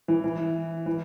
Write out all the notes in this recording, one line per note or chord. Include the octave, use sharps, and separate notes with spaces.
E3
E3
E3